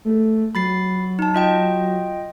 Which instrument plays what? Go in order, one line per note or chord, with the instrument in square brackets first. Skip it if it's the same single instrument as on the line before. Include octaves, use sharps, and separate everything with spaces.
[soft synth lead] A3
[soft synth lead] F#3 [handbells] B5 A6 C7
[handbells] D#4 A5
F4 D#5 G5